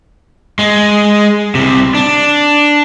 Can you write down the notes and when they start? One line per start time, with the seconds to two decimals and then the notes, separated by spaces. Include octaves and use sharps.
0.59 G#3
1.55 C2 C3
1.95 D4